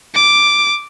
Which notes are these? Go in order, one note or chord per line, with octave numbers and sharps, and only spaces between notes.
D6